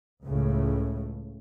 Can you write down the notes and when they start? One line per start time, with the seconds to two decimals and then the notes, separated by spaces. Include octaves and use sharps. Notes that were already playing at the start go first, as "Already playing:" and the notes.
0.24 C#2 A2 C#3